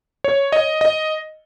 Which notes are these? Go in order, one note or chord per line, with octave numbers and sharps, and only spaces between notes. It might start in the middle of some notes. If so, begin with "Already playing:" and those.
C#5
D#5
D#5